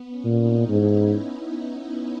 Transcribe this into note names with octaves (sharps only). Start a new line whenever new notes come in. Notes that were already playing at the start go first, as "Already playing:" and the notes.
Already playing: B3
C#4
A#2
D#4
G#2 E4